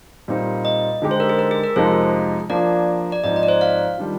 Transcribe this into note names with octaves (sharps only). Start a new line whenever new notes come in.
A#2 G3 C4 D#4
D#5
D3 G#3 D#4 G4
C5
A#4
G#4
A#4
G#4
A#4
F2 C3 F3 G#3 D#4 C5
F3 A#3 D4 D5
D5
G#2 F3 C4 D#4 D#5
D#5
D5
C5
F5
D#3 G3 D4 F4